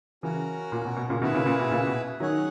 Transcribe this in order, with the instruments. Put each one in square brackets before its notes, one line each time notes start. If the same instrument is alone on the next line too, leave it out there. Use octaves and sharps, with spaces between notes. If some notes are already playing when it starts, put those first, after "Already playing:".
[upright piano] C#3 E3 [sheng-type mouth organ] C#4 F#4 A#4
[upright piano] A#2
B2
B2
A#2 C#3
[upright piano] B2 D#3 [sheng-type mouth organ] E4 G#4 B4 E5
[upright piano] A#2 C#3
A#2
B2
A#2 C#3
B2
[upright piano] D#3 F#3 [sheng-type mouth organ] C#4 G#4 C#5 F#5